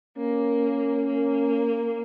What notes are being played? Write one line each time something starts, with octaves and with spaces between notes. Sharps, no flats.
A#3 C#4
A#3